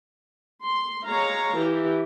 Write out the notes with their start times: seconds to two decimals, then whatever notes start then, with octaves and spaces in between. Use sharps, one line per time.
0.64 C6
1.07 G#3 C#5 F5 A#5
1.55 E3 G4